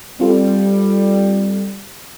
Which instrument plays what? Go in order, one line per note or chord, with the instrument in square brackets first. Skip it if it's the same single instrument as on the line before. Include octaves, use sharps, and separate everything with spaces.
[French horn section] G3 [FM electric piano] C4 F4 A4